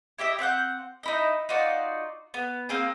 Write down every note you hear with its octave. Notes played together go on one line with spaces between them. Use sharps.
E4 G4 D#5 E5
C4 E5 F#5 G6
D#4 E4 D#5
D#4 F4 F#4 D5
B3
A#3 C4 G#4